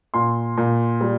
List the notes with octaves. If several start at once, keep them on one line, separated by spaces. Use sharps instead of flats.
A#2 C6
A#2
G3